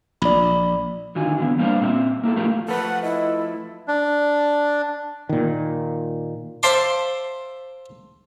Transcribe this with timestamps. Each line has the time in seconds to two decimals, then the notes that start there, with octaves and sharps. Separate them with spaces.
0.22 A#1 D5 B5
1.15 D3 D#3 F4 F#4 G#5
1.38 D3 E3 B3
1.58 G3 A#3 D4 A#4 C5 F5
1.81 A#2 C4 B4 E5
2.23 A#3 E4 G4 A4
2.36 F3 A3 E4 F4 G4 A#4
2.68 F3 A3 A4 B4 F#5
3.03 E4 D#5
3.88 D4
5.29 A#2 D#3
6.63 C5 E5 F5 A5 C6 D6